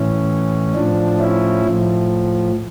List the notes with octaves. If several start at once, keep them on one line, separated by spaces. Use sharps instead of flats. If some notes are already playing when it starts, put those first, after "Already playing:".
Already playing: A2 E3 C#4
A2 F3 D4
C#4 E4
A2 F3